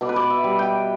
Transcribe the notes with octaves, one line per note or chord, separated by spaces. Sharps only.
B2 D5
B4
D5
E5
G3
G5